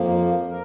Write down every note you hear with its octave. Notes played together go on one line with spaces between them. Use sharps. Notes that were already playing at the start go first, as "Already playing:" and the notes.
Already playing: F2 F3 A#3
A#4